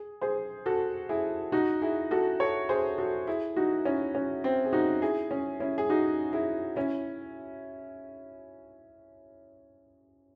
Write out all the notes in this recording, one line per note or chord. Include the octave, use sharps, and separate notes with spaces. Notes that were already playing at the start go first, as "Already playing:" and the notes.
Already playing: G#4
G#4 C5
F#4 A4
E4 G#4
D#4 F#4
E4 G#4
F#4 A4
A4 C#5
G#4 C5
F#4 A4
E4 G#4
D#4 F#4
C#4 E4
C#4
C4
G#4
D#4 F#4
E4 G#4
C#4
C#4 E4
G#4
D#4 F#4
E4 G#4
C#4 E4